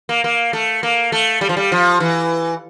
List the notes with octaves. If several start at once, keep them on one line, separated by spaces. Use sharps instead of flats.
A#3
A#3
A3
A#3
A3
G3
F3
G3
F3
E3